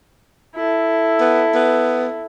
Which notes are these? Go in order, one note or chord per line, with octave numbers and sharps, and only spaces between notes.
E4 A4
B3
B3